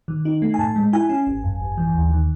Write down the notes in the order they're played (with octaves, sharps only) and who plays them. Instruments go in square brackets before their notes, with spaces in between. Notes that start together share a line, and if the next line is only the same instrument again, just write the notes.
[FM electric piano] D#3
D#4
A3
G#5
A2 A5
G#3
E4 G#5
C#4
G#1
F#2
G#1
E3
D#2
D#3